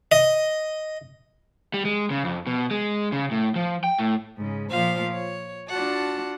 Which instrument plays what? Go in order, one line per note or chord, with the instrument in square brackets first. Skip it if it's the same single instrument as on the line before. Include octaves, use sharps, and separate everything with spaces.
[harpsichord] D#5
[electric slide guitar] G3
G#3
C#3
F2
B2
G#3
C#3
A2
F3
G5
A2
[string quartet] G#2 C#3
A#2 F3 F4 C5 F5
C#5
D4 F4 F#4 F#5 A5